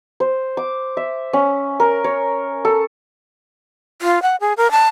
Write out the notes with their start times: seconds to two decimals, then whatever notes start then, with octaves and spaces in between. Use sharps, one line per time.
0.20 C5
0.57 D6
0.97 E5
1.33 C#4
1.80 A#4
2.04 C#5
2.65 A4
4.02 F4
4.22 F#5
4.41 G#4
4.57 A#4
4.71 A5